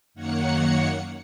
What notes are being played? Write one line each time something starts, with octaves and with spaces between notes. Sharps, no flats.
F#2 D#3 A#3 C#5 F#5 C#7